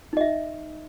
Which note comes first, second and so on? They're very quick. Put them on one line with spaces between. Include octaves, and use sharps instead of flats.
D#4 D#5 E5